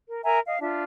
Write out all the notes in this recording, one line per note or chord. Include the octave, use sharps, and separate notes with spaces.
A#4
A#4 E5 G#5 A#5
D#5 F5
D4 F4 E5